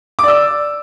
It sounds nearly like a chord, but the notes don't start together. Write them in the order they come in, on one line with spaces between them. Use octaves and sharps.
D6 D5 E6